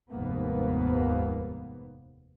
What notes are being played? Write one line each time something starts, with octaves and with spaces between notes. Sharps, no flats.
F1 D#2 G#2 A#3 B3